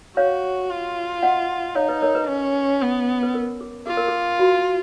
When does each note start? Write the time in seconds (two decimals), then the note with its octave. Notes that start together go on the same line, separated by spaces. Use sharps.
0.17 F#4 C#5 F5
0.70 F4
1.23 D#5 F#5
1.75 D#4 C#5 F5
1.88 B4 D#5
2.02 A#4 C#5
2.15 B4
2.28 C#4
2.82 B3
3.23 B4
3.34 A#4
3.61 G#4
3.87 F4 G#4
3.97 A#4
4.08 G#4
4.39 F#4